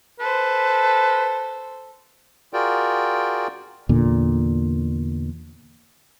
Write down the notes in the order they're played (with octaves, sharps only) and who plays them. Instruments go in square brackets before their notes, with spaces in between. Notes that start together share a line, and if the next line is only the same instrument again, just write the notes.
[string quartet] A4 C5 [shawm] B4
[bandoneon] F4 F#4 G#4 A#4 D5 G5
[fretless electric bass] E2 A#2 D3